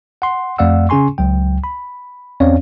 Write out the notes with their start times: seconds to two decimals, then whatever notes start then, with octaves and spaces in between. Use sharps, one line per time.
0.22 F#5 C6
0.58 F2 A3 D5 F5 F#5 E6
0.89 C#3 C#4 G#4 G#5 C6 C#6
1.18 C#2 F#3 G5
1.64 B5
2.40 E2 C4 C#4 C#5 D5 F5